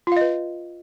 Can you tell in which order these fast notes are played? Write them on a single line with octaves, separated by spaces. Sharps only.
F4 F5 D#5 B4